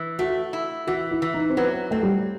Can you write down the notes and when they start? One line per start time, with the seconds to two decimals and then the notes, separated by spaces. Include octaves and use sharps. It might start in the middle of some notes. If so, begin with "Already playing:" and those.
Already playing: E3
0.19 A3 F#4
0.53 E4
0.87 E3 F#4
1.11 E4
1.22 E3
1.34 D#4
1.50 C4
1.57 F#3 B3
1.91 A3 C4
2.03 G3